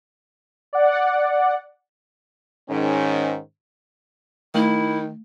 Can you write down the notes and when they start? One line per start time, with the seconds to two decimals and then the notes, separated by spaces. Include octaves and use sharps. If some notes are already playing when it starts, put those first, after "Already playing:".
0.73 D5 F#5
2.70 G#2 D#3 C#4
4.55 D#3 A3 E4